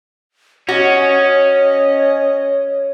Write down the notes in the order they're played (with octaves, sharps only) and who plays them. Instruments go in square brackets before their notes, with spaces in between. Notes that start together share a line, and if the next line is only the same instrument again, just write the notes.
[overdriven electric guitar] C#4 [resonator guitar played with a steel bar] F#4 [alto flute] C#5 [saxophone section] D#5